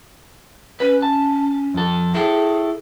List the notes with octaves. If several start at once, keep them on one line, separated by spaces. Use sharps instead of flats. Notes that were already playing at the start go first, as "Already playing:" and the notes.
C#4 B4
A5
F2 A4
E4 G#4 A4